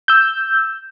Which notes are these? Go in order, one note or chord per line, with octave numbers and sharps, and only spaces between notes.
E6 G6